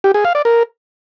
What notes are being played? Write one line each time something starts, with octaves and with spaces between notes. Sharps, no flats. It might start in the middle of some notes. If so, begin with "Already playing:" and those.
G4
G#4
F5
D5
A#4